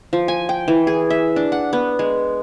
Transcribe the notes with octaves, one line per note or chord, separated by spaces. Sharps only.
F3
G#5
G5
E3
G#4
E5
D4
F#5
B3
G#3